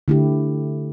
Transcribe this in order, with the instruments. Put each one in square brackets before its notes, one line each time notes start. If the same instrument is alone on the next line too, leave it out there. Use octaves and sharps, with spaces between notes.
[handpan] D3 A3 E4 G4